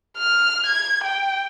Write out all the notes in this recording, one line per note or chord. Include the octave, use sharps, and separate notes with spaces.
F6
G#6
G5